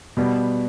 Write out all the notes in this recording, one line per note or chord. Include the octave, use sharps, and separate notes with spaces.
B2 G3 B3